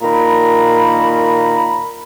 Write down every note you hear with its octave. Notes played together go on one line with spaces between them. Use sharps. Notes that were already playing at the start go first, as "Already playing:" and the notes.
A#2 D#3 A#5 B5